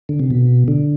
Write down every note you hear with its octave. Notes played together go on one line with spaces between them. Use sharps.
D3
C3
B2
D3